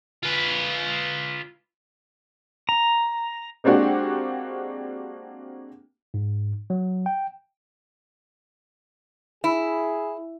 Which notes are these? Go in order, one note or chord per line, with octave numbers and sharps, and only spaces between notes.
F4 B4
A#5
G#3 A#3 C4 D4 F#4 G4
G#2
F#3
G5
E4 G#4